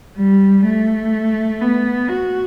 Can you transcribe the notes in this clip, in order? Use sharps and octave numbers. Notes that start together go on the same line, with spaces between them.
G3
A3
B3
F#4